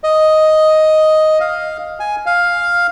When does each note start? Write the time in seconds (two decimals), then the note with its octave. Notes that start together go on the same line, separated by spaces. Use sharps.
0.04 D#5
1.40 F5
2.00 G#5
2.26 F5